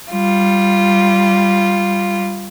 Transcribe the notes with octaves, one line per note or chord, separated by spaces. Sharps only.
G3 F4